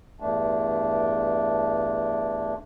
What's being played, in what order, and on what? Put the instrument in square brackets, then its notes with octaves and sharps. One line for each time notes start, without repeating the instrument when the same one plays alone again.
[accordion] E2 G2 A3 D4